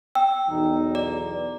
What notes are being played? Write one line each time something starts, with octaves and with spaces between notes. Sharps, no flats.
G5 E6
B1 E2 D#4
D5